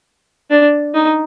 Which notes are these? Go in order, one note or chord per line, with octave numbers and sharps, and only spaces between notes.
D4
D#4